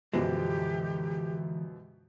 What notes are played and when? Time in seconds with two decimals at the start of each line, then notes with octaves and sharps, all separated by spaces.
0.14 F#2 B2 D3 E3 F3 G#3 G4